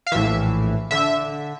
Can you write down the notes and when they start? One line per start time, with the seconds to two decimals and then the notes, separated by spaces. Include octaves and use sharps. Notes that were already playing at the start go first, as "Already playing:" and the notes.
0.07 F5
0.12 A#1 A2 E3 E5
0.91 D3 E5